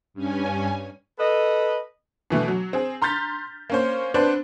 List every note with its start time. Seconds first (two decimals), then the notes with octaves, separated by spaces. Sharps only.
0.14 G2 C#4 G#5
1.19 A4 B4 D#5
2.30 B2 E3 A3
2.48 F#3
2.73 C4 G#4
3.02 A#5 C6 F6 G6 A6 B6
3.70 A#3 C#4 C5
4.14 B3 C4 D4 B4 C5